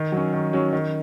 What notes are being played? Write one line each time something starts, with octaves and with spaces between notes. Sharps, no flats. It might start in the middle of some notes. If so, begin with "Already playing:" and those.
Already playing: D#3
F#3 C#4
D#3
F#3 C#4
D#3